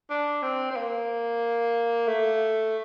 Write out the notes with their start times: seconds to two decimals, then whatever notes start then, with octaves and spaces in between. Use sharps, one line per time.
0.10 D4
0.43 C4
0.71 C4
0.76 A#3
2.08 A3